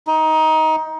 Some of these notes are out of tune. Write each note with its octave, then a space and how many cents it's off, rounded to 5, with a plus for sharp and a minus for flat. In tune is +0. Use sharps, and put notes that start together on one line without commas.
D#4 +20